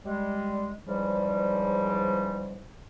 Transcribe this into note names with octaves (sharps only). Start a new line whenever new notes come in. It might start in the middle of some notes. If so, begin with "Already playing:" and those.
G3 G#3
G#2 C#3 E3 F3 G3